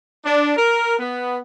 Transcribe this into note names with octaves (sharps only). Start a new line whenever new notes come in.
D4
A#4
B3